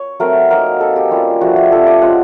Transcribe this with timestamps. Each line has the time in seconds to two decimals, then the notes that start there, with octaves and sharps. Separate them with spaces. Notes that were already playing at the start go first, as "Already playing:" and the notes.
Already playing: C#5
0.20 F#3 A3 C4 A#4
0.51 F#3 A#3 D#4 A#4
0.80 A#3 D#4 A4
0.96 G4
1.11 G3 A#3 C#4 F4
1.41 F3 A3 D4 F#4
1.56 G4
1.71 F3 A3 C4 A4
1.87 D5
2.02 G#3 C#4 F4 F#5